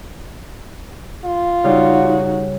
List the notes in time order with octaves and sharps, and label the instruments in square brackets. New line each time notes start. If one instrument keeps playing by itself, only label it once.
[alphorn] F4
[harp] C#3 G3 [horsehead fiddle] D#4 F#4